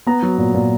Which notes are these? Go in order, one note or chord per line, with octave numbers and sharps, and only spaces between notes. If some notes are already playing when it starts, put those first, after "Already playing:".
B3 A#5
F#3
A#2
A#2